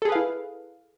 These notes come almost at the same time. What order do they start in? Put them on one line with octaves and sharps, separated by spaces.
A4 G#4 B4 F5 E4